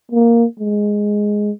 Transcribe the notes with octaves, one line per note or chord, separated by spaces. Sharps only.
A#3
G#3